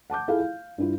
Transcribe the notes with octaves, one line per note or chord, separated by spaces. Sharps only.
F#5 A5 D6 G6
E4 F4 G#4 A4 F5
F5
G2 E4 F4